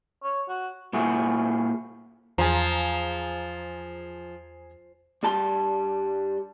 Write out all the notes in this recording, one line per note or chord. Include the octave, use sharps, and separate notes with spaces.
C#5
F#4
A#2 E4 F#4 G#4
E2 F3 G#4 A#5
G2 G3 A5 C6